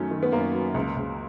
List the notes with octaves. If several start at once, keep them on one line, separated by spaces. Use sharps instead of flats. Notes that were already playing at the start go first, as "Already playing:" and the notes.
Already playing: F#2 D#3 F#3 A3 C#4
D#3
B3
F#2 A#3
F#3
C#2
C#2